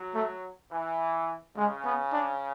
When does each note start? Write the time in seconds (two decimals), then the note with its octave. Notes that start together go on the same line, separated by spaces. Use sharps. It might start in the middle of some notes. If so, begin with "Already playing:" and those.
Already playing: F#3
0.15 A3
0.71 E3
1.56 C#3 G#3
1.85 B3
2.13 D4